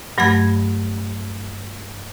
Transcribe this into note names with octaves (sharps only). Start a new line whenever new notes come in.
G2 F#3 A3 B5 G#6